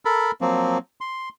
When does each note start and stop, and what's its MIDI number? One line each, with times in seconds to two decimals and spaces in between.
0.05 0.31 69
0.05 0.31 70
0.05 0.31 83
0.41 0.78 53
0.41 0.78 54
0.41 0.78 58
0.41 0.78 60
1.01 1.29 84